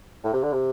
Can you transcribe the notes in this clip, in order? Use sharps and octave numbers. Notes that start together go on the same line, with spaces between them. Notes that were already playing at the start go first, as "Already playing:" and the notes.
A2
C3
D3
C3